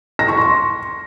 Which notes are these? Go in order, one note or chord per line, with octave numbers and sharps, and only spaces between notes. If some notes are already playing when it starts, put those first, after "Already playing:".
A#6
C#6
C6